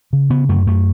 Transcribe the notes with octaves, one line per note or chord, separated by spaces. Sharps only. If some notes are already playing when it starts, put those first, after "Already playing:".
C#3
C#3 B3
F#2 A3
F#2 A3